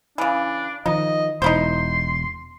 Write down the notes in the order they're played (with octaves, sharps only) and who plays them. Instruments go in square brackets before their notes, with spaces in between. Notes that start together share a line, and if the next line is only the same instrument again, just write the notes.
[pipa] C#3 E3 [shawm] D4
[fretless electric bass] D#3 F3 [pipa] D#4 [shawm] D#5
[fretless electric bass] E1 [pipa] D#4 E4 C5 [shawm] C6